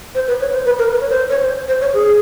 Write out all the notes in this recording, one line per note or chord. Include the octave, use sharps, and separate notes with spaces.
C5
B4
C#5
C5
B4
A#4
B4
C#5
C5
C#5
C5
C5
C#5
G#4